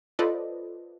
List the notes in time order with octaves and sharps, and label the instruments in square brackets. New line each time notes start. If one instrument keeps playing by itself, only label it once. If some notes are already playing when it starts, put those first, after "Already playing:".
[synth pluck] F4 A4 B4 C5 D5 D#5